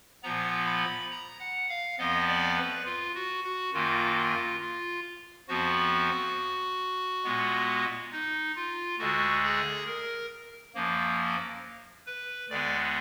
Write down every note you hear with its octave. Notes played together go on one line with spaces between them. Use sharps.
A#2 F3 B3 A#5
B5
A#5
F#5
F5
F2 F3 B3 D#5
D5
B4
F4
F#4
F#4
F#2 D#3 A#3 F4
F4
F4
F2 F3 B3 F#4
A#2 G#3 B3
D#4
F4
D2 D3 G#3 F#4
G#4
A#4
F#2 F3 A#3
B4
D2 D3 G#3 B3 D5